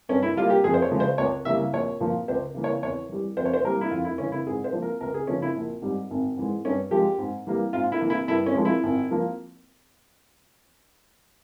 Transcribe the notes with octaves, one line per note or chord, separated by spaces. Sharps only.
G2 C#4
E4
G3 A#3 F4
G4
F2 G#4
C5
C#5
C#3 F3 G#3
C5
C#2 C#5
C#3 E3 G3 A#3 E5
A#1 C#5
A#2 F3 A#3
C#2 C5
C#3 E3 A#3
C#5
E2 C#5
E3 G3
F2 C5
C#5
C5
E3 G3 A#3 A#4
E4
F2 F4
E4
C#3 E3 C#4
E4
G#2 G#4
C5
F3 A#3
A#4
C#2 A#4
G#4
C#3 F3 C#4
E4
A#1
G#2 G3
G#1
G#2 E3 G#3
G2 C#4
F3 G#3 G4
G#2
E3 G3 A#3
G#2 F4
E4
E3 A#3
E4
G2 E4
C#4
F3 G#3
E4
G#1
F3 A#3